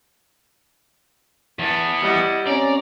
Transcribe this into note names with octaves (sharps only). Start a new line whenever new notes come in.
E2 B3 A5
G3 E4 D#5 F#5
C4 C#4 D5 A#5